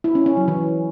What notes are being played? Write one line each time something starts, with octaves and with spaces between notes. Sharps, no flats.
E4
C#4
C#4
F#3
E3